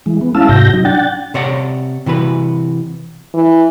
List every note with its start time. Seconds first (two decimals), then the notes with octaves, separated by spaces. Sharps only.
0.06 E3 G#3
0.21 B3
0.35 G#3 C#4 E4 F5 A5 E6
0.49 G#2 C3 F#4 G6 A#6
0.73 F#3 D#4
0.85 D4 F#5 G5 A6
1.34 C3 C#5 D5 F#5
2.06 C3 E3 F#4 B4
3.34 E3